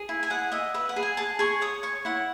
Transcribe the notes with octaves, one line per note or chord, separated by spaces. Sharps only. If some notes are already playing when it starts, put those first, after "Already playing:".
Already playing: G#4
E4
G#5
G#4 F#5
D#5 E5
B4 E5
F#5
G#4
G#5
G#4 A5
G#4 C#6
C#5 D#6
C#5 C#6
E4 F#5